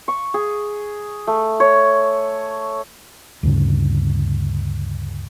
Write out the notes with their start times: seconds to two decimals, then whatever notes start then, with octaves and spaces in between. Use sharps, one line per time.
0.08 C#6
0.34 G#4
1.27 A3
1.60 C#5
3.43 D2 G2 C#3